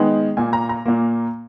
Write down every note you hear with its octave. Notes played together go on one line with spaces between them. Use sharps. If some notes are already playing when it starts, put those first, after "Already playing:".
Already playing: D#3 G#3 B3
A#2 A#3 G#5
A#5
A#5
A#2 A#3